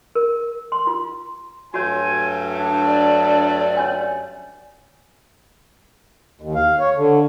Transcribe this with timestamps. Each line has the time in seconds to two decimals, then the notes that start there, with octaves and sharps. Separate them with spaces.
0.15 A#4
0.72 C6
0.87 F4
1.74 G2 F#3 A3 F#4 C#5 G#5
2.59 D4
2.86 D5
3.77 C#4 C#5 G#5
6.41 D#2
6.55 F5
6.79 C#5
6.96 D3